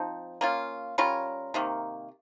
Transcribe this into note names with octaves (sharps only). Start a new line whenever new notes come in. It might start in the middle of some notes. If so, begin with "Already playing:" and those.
Already playing: F3 C4 D#4
A#3 C#4 F4
G3 C#4 F4 A#4
C3 D#3 A#3